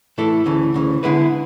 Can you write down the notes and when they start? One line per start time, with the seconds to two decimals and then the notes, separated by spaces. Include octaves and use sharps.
0.18 A2 E3 A3 E4 A4
0.46 D2 C#3 E3
0.74 D2 C#3 E3
1.03 D3 G#3 B3 E4 B4